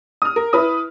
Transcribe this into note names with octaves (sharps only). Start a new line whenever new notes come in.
D#6 F6
A#4
E4 B4 D#6